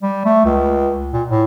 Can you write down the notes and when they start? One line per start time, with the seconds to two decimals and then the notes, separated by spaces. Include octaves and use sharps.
0.03 G3
0.25 A3
0.45 C#2
1.13 A#2
1.29 A2